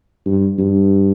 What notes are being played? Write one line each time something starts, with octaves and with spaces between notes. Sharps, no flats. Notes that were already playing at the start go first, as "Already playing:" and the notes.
G2
G2